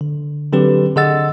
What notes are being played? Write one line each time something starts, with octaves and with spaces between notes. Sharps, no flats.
D3
D3 F#3 C4 G4 B4
D3 G#4 D#5 F#5 E6 A6